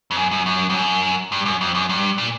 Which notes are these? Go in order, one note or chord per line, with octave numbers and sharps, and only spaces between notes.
F2
F#2
F#2
F#2
F2
F#2
G2
F#2
F2
F#2
G2
A#2